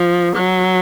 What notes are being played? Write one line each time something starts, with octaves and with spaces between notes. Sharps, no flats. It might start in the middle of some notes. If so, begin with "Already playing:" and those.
Already playing: F3
F#3